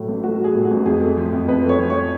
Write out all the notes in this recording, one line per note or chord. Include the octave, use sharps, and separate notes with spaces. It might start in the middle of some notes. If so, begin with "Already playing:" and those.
Already playing: A2 F#3 A3
A1
A3 F#4
F#3 G#4
A2
F#4
A1
F2 G#4
A3
F3
F2
F2 B4
A3
C#5
F3
C#5